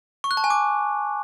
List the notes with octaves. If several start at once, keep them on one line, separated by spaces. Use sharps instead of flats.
C#6
F#6
A5
G#5
D6